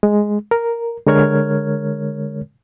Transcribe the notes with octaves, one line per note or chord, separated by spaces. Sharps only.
G#3
A#4
D3 G#3 A#4 C#5 F6 G#6